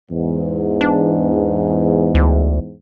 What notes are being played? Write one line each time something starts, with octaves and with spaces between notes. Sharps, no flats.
E2 G#2
D4
D2